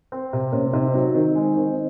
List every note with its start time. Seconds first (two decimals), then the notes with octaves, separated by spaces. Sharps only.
0.12 C4
0.33 C3
0.52 C3 A#3 C#4
0.73 C3 C4 D#4
0.94 F#3 C4 D#4
1.14 D#3
1.35 G#3
1.57 D#3